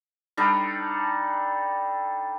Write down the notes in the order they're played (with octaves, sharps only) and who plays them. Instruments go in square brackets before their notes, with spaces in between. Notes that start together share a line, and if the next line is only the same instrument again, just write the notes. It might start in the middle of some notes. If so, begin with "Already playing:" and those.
[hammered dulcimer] G3 D4 D#4 A4